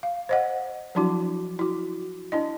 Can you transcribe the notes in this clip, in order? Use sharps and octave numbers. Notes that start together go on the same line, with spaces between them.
F5
C5 D#5 F#5
F3 F#3 D4 E4 F#4
E4 F#4
D4 E4 D#5